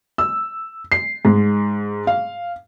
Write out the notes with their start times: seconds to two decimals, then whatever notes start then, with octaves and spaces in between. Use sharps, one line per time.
0.18 E6
0.92 C7
1.25 G#2
2.07 F5